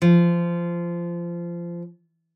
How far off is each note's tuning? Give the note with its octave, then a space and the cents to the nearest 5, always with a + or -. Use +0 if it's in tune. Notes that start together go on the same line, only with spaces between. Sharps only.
F3 -20